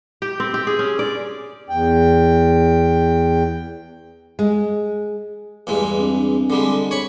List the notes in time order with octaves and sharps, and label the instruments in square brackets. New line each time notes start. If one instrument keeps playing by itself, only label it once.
[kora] G4
C4
G4
G#4
C#4
D5
[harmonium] E2 G5
[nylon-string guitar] G#3
[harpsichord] E2 G2 G#3 [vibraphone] G4
[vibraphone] C4 D4
[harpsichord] D3 G3 G#3
C#5 B5 C#6